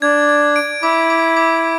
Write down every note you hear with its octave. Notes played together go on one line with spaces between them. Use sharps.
D4 G#6
G#6
D7
E4 D6
D6
D6